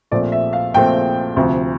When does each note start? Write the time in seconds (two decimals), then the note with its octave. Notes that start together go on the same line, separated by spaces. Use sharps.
0.11 A#1 A#2 A3 C4 D5
0.32 E5
0.53 F5
0.74 A#1 A#2 A3 C4 G5
1.36 D2 C3 F3